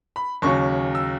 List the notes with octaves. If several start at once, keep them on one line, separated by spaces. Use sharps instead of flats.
B5
D#2 C#3 F#3 C#4 C#6
E6